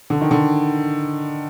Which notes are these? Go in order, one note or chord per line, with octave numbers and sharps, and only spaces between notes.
D3
D#3
D3